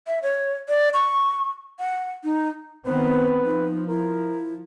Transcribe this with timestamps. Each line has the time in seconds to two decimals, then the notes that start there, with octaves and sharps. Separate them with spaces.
0.07 E5
0.23 C#5
0.69 D5
0.94 C#6
1.79 F#5
2.24 D#4
2.86 D#3 B3 C4 B4 C5
3.45 F3 D#4
3.89 E4 A#4